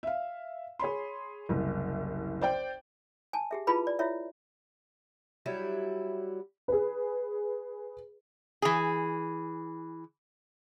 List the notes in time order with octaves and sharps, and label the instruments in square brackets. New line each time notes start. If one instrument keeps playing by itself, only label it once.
[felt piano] E5 F5
G#4 C#5 B5 C6
F#1 C2
C5 D5 G5
[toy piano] G#5 A5
G4 G#4 E5
E4 F4 G#4 B4 A5 B5
D5
E4 F4 C#5 E5
[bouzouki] F#3 G3 E4
[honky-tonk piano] G#4 B4
[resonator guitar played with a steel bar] E3 G#4